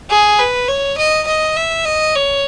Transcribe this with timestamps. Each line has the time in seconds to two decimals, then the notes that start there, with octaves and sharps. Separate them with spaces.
0.10 G#4
0.39 B4
0.68 C#5
0.98 D#5
1.27 D#5
1.57 E5
1.85 D#5
2.15 C#5